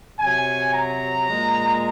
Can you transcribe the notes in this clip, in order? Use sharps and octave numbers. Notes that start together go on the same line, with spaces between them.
C3 F#3 G#5
A#5
A#2 G#3